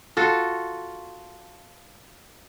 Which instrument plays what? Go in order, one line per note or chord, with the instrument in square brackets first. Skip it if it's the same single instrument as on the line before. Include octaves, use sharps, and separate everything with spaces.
[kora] F4 F#4 A4